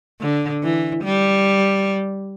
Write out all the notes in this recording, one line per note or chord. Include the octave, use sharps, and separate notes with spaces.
D3
E3
G3